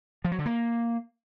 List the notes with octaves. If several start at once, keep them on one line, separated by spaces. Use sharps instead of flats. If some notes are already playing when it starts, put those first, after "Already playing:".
F3
F#3
D3
A#3